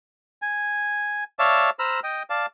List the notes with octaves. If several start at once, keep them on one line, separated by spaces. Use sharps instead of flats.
G#5
C#5 D5 E5 F5 A5
C5 A#5 B5 E6 F6
D#5 G5
D5 F5 A5